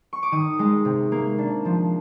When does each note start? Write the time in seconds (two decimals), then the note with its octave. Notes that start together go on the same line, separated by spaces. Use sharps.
0.13 C#6
0.23 D6
0.32 D#3 D#6
0.59 G#3
0.85 C3
1.12 A#3
1.38 D4
1.65 F3